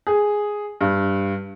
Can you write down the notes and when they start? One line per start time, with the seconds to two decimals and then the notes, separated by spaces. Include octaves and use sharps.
0.07 G#4
0.81 G2